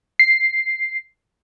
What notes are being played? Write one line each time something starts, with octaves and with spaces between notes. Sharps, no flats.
C7